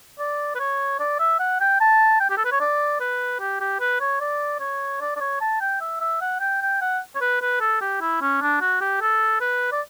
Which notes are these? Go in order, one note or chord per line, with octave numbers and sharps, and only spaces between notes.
D5
B4
C#5
D5
E5
F#5
G5
A5
G5
G4
A4
B4
C#5
D5
B4
G4
G4
B4
C#5
D5
C#5
D5
D5
C#5
A5
G5
E5
E5
F#5
G5
G5
F#5
C#5
B4
B4
A4
G4
E4
C#4
D4
F#4
G4
A4
B4
D5